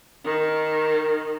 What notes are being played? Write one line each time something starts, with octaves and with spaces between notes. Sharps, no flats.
D#3